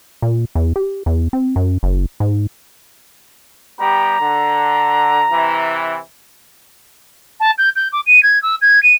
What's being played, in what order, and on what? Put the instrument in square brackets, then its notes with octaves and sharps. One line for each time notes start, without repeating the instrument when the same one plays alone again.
[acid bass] A#2
E2
G4
E2
C4
F#2
F#1
G#2
[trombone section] G3 B3 G4 [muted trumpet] A#5
[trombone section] D3
C3 E3
[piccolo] A5
G6
G6
D6
D#7
G#6
E6
G#6
D#7